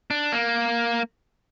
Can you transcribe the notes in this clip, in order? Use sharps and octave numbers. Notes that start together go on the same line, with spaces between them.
D4
A#3